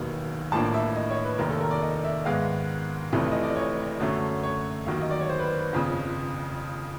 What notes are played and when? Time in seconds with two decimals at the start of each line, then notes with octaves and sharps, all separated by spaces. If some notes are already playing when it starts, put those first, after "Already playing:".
Already playing: E1 D#2 D#3 F#3 B3
0.52 A1 A2 F3 A#3 D4 A5
0.74 E5
0.96 D#5
1.11 C#5
1.25 B4
1.38 F1 D#2 D#3 A#4
1.50 A4
1.61 A#4
1.71 D5
1.83 D#5
2.04 E5
2.25 G#2 D#3 G#3 B3 F5
3.13 F1 F2 C3 E3 A3
3.32 D#5
3.43 D5
3.56 C#5
4.00 F#2 D3 F#3 A3 C#4
4.43 C#5
4.86 D#2 D#3 F#3 A#3
5.02 D#5
5.11 D5
5.21 C#5
5.29 C5
5.39 B4
5.44 C5
5.58 B4
5.73 G1 F2 C#3